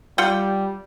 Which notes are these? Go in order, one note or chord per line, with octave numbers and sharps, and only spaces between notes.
G3 F4 F#5 G5